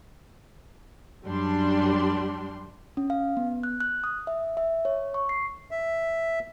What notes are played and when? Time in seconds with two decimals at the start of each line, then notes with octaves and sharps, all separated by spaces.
1.26 F#2 G3 D4 C6
2.97 C#4
3.10 F5
3.37 B3
3.63 F#6
3.80 F#6
4.04 D#6
4.27 E5
4.57 E5
4.85 C#5
5.14 C#6
5.29 C7
5.71 E5